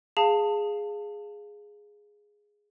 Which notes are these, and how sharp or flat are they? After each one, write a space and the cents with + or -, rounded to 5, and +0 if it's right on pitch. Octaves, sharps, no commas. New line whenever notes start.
G#4 +0 F5 +0 A5 +20